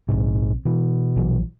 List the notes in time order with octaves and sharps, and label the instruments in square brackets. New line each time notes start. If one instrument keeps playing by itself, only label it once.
[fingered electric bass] A#1 C3 [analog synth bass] G#2
[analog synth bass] B2 [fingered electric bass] E3
[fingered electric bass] A#1 E3 F#3